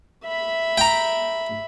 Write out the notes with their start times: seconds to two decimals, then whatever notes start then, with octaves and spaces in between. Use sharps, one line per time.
0.24 E5 B5
0.78 G5 A#5